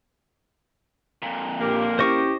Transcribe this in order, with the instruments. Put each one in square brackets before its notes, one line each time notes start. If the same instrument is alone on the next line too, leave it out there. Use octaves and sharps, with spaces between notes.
[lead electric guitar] F2 A#2
[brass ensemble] A#1 G4 [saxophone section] A#3
[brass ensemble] C#4 E4 G4 [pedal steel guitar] C5 D#5 C#6